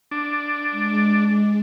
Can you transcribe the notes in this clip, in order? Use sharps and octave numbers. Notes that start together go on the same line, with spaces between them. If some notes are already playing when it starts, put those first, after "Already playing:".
D4
G#3